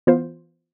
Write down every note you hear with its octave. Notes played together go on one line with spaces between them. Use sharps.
E3 B3 F4 C5